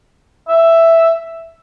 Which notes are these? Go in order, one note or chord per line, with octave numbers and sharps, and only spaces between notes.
E5